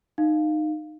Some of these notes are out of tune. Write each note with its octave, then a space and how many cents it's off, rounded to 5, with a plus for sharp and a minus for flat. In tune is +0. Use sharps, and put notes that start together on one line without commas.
D#4 -15 F5 +0